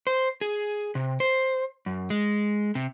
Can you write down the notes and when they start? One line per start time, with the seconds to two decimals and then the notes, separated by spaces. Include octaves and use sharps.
0.07 C5
0.41 G#4
0.95 C3
1.20 C5
1.86 F#2
2.10 G#3
2.75 C3